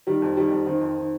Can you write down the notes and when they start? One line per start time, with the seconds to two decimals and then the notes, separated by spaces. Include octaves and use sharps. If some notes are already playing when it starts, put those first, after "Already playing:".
0.07 D#3 G3
0.22 F2
0.37 D#3 G3
0.51 F2
0.66 D#3 C4
0.81 F2
0.97 D#3